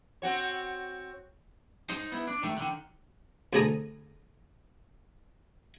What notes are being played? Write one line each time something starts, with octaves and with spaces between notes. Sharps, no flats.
C4 F#4 C#5
D#4 C5
B3 E4
D4
D#3 A3
D3 D#3
D2 C4 G#4 A4 A#5 D#6